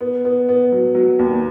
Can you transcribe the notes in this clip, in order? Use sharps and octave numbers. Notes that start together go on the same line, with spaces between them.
B3
B3
B3
F#3
F#3
D#2